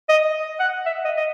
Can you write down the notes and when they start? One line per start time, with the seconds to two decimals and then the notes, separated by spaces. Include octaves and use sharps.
0.09 D#5
0.60 F#5
0.86 E5
1.05 D#5
1.17 D#5